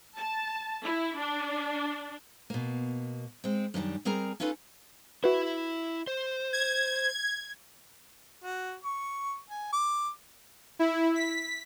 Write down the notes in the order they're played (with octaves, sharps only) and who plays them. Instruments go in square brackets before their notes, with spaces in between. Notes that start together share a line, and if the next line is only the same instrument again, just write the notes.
[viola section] A5
E4
D4
[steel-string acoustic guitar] B2 A#3
G#3 C4
F#2 D#3 G3 D4
G3 C4 G#4 A#4 A#5
C#4 D#4 F4 A4 B4
[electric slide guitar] E4 E5 [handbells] F#4 B4
[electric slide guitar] C5
[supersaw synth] G#6
[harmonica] F#4
C#6
G#5
D6
[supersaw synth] E4
B6